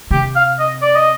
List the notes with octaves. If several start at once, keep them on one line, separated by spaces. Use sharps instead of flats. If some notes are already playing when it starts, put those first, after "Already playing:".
C3 G4
F5
D#5
D5
D#5